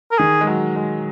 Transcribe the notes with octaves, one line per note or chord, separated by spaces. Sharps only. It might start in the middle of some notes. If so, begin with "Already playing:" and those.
A#4
D#3 G#4
G#3
F#3
G#3